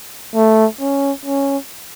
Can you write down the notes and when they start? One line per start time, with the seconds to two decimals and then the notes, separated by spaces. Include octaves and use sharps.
0.35 A3
0.80 C#4
1.26 C#4